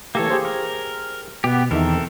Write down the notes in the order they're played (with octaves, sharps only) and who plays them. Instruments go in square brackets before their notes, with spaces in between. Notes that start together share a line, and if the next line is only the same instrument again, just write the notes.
[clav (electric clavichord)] E3 A3 G4 [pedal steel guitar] A#3 A4 C#5
[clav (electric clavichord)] G4 G#4 C5
[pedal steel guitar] A#4
[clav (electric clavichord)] B2 [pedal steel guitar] B3 G4
[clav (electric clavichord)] E2 D#3 E5 [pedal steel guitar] C4 A4 A#4